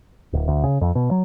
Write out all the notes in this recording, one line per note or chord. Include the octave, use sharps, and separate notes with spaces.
D1
D2
C#3
F2
B2
F#3